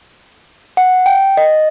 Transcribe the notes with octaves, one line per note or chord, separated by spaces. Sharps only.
F#5
G5
D#5